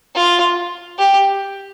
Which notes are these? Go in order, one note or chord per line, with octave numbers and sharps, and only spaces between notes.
F4
G4